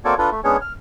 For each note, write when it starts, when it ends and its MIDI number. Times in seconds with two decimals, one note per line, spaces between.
0.05 0.14 58
0.05 0.14 60
0.05 0.14 66
0.05 0.14 69
0.05 0.14 73
0.05 0.14 74
0.18 0.30 62
0.18 0.30 65
0.18 0.30 69
0.18 0.30 71
0.32 0.41 57
0.44 0.57 56
0.44 0.57 59
0.44 0.57 61
0.44 0.57 62
0.44 0.57 68
0.44 0.57 73
0.61 0.73 89